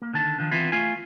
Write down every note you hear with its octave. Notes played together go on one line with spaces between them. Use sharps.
A#3
D3 D#3 A5
D#3 F3 D4
E3 B3 C4 E4 F4
A3 F4 G#5